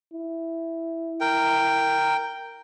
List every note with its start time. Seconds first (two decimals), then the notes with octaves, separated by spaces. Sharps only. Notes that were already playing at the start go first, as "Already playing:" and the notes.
0.12 E4
1.21 A#4 G5